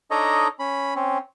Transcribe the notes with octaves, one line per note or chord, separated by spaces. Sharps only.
D4 D#4 A4 C#5 D#5 A#5
C#4 B5
C4 C#4